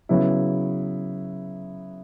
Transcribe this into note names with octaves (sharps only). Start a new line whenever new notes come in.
C#3 F#3 B3 E4